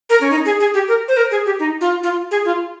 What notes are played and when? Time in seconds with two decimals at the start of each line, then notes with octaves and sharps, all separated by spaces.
0.10 A#4
0.21 C#4
0.31 D#4
0.45 G#4
0.60 G#4
0.74 G4
0.88 A#4
1.08 C5
1.17 A#4
1.31 G#4
1.46 G4
1.60 D#4
1.81 F4
2.03 F4
2.31 G#4
2.45 F4